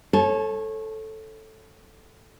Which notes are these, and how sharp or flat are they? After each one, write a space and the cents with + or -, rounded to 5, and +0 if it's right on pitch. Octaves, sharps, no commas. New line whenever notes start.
A4 +0 C#5 -25 A5 -40